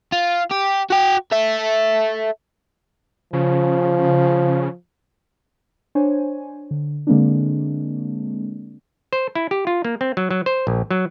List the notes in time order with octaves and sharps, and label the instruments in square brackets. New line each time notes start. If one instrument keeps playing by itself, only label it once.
[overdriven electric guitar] F4
G4
F#4 G5
A4 E5
[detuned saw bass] C#3 [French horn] F3
[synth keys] D4 C5 C#5 G#5
D3
D3 G#3 A#3 C4 D4
[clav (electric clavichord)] C5
E4
G4
F4
A#3
C4
F#3
F#3
C5
A#1
F#3